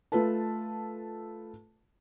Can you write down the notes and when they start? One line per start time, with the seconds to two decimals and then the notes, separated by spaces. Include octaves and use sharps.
0.12 A3 F4 A4 B4 A5